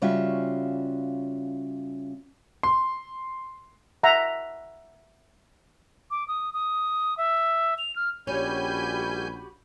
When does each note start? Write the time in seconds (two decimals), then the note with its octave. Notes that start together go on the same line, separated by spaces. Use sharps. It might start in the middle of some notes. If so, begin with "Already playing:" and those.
0.02 C#3 G3 C#4 F4 F#4 E5
2.63 C6
4.03 E5 F#5 A#5
6.11 D6
6.28 D#6
6.53 D#6
7.18 E5
7.78 F7
7.96 F6
8.27 A#1 G3 C#4 F#4 G4 G#5 B5 G6